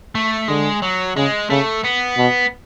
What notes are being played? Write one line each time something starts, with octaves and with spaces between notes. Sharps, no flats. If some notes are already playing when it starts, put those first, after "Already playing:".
A3
D3 G#3
F#3
C#3 G#3
C#3 A3
B3
B2